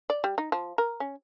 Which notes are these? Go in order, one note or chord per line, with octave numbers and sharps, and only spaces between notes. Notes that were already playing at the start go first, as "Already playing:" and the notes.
D5
G3
D#4
F3
A#4
C#4